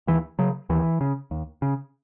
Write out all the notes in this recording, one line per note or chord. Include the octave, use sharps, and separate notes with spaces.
D#2 E3
C#3 F#3
D#2 E3
C#3
D#2
C#3